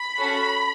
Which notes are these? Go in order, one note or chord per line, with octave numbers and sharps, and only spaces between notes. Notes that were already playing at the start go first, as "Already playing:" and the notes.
Already playing: B5
C#4 F#4 A4